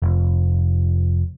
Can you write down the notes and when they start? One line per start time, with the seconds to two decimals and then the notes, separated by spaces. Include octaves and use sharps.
0.02 F1